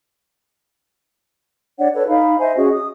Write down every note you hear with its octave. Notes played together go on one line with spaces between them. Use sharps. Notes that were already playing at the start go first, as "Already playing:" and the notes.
D4 C#5 D5 F#5
A4 B4 C#5
D#4 F5 B5
C5 D#5 E5 G#5
C#4 F#4 G#4 D#5
D#6